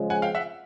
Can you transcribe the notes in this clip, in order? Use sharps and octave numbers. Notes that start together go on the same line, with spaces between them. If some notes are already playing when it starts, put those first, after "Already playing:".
Already playing: C#3 F3 G#3
F#5 G#5
F5 G5
E5 F#5